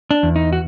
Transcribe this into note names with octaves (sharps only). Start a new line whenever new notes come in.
D4
E2
D#4
F#4